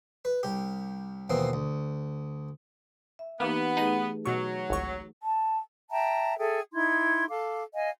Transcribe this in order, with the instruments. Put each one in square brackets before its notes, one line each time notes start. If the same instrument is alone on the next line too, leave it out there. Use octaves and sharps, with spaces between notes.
[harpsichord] B4
C2 G4
D#2 B2 E3 A#3 C4
D2
[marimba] E5
[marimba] E3 D#4 G4 [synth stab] A#3 [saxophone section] B3
[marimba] A3 G#4 B4 [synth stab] D#4 D#7
[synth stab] B2 C#6 [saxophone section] F#3
[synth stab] G#1 C#2 C#6
[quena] A5
[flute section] E5 G5 A5 A#5
G#4 A4 E5 G5
D#4 E4 C6 G#6
A4 F5 D6
D#5 F5 G#5